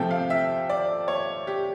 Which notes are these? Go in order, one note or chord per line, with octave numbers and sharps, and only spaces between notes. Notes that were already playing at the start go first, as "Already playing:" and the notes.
Already playing: C3 F3 A3 C4 G5
F5
E5
D5
C#5
G4